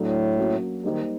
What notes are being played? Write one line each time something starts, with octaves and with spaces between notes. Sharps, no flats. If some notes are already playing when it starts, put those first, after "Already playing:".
Already playing: A2 F#3 A3 D4
F#3 A#3 C#4 F#4
D#3 G3 A#3 D#4 G4 C5